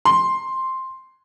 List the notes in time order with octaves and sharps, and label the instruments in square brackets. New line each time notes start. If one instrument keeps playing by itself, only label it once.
[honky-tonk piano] C6